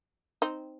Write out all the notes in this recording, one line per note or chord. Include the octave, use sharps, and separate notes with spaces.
C4 D#4